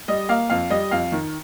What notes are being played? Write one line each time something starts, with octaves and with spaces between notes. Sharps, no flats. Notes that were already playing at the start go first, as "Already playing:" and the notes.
G3 D#5
A#3 F5
F2 F5
G3 D#5
F2 F5
D#3